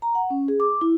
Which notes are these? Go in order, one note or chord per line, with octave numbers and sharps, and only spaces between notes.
A#5
F#5
C#4
G#4
D6
E4